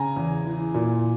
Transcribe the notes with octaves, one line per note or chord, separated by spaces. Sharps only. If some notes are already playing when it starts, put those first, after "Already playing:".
Already playing: C#3 G#5 A#5
E2
E3
A#2